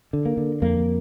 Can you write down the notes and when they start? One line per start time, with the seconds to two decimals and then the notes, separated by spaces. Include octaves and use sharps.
0.13 D3
0.26 A#3
0.37 D3
0.62 F2 A#3